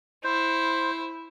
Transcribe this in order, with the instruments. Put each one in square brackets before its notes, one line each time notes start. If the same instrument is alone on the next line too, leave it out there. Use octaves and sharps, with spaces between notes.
[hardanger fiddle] E4 [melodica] C5